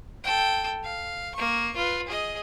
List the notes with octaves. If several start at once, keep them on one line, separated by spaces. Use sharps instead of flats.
A4 G5
F5
A#3 C#6
F4 B4
G#4 D#5